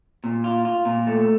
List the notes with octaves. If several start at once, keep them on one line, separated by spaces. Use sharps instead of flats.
A#2
F4
F4
A#2
A3